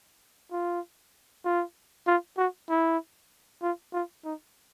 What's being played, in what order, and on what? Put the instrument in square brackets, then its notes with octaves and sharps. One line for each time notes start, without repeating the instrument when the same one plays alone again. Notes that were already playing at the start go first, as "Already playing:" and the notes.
[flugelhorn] F4
F4
F4
F#4
E4
F4
F4
D#4